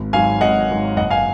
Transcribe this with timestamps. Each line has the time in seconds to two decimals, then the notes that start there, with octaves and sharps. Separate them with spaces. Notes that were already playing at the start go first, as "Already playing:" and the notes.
Already playing: G#1
0.13 G#2 F#3 C#4 F5 G#5
0.41 G#1 D#5 F#5
0.70 G#2 F#3 C#4
0.96 F#1 D#5 F#5
1.11 F5 G#5